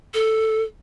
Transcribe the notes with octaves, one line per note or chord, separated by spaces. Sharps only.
A4